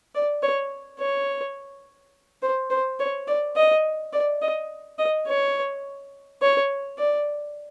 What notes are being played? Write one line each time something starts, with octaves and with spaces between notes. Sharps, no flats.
D5
C#5
C#5
C5
C5
C#5
D5
D#5
D5
D#5
D#5
C#5
C#5
D5